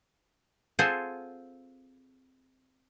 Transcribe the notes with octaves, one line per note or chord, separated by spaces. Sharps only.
C4 F4 G#4 A4 C5 F#5